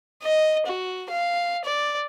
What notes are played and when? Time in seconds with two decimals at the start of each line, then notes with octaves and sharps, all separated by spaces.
0.22 D#5
0.66 F#4
1.10 F5
1.64 D5